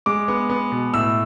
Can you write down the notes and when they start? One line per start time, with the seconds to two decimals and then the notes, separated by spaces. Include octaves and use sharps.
0.06 G#3 D6
0.28 B3
0.50 B3
0.72 B2
0.94 A2 E6